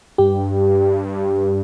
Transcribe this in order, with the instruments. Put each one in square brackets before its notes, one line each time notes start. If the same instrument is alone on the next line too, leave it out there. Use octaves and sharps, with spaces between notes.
[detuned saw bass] G2 [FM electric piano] G4